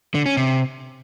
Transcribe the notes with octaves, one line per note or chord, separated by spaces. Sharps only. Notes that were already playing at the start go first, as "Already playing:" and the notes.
D3
C#4
C3